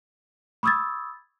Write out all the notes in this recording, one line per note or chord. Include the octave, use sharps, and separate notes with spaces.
B5 C#6 D#6 E6 G#6 A6